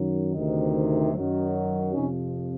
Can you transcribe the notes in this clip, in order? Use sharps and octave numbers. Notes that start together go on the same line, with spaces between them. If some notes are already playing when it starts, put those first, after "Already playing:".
Already playing: F#2 D#3 F#3
D2 C3 D#3
F#2 D#3 F#3
F2 C3 F3 C#4 D#4